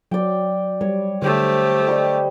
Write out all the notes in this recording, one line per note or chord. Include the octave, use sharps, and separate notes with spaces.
F#3 D5 G5
G3 C#5
D3 A3 G4 C5 C#5
G3 D#5